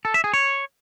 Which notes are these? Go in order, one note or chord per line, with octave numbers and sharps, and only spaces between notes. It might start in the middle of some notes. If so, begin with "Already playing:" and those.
A4
E5
G#4
C#5